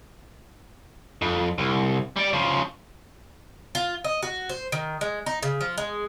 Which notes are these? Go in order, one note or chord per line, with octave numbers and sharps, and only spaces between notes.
F2
C2
G3 D5
C#3 F3
F4
D#5
F#4
C5
D#3
G#3
D#4
C#3
F3
G#3